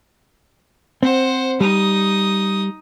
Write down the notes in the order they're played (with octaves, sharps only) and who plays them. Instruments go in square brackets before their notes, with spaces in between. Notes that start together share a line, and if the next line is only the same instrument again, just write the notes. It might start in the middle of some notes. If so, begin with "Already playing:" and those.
[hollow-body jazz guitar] C4 [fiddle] C5 F#5
[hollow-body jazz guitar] G3 [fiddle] D#4 D#6